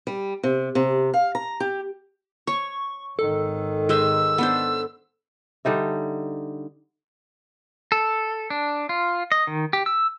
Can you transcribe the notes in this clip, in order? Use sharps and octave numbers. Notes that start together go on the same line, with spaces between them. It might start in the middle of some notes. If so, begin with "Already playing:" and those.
G3
C3
C3
F5
A#5
G4
C#5 C#6
G#1 D#3 A4
G#3 C5 E6
B3 D4 C5
D3 G3 D#4 E5
A4
D4
F4
D#5
D#3
G4
E6